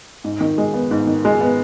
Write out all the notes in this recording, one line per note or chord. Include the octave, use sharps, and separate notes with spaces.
G#2
D#3
G#3
B3
G#2
D#3
G#3
B3